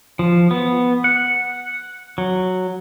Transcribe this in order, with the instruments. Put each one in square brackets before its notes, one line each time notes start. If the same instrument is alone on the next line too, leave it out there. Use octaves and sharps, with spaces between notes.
[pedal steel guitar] F3
B3
F#5
F#3